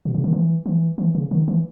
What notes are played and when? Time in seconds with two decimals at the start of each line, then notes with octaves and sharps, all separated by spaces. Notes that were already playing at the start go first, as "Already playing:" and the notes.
0.05 B2
0.14 C#3
0.24 D#3
0.33 E3
0.66 E3
0.98 E3
1.15 C#3
1.31 D#3
1.48 E3